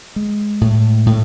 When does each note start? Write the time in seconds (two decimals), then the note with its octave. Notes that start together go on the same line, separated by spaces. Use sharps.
0.16 G#3
0.61 A2
1.06 A2